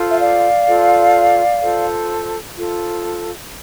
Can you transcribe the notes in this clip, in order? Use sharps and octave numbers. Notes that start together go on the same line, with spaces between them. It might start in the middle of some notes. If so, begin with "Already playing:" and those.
Already playing: F4 A4 C5
E5
D5 F5
F4 A4 C5
F4 A4 C5
F4 A4 C5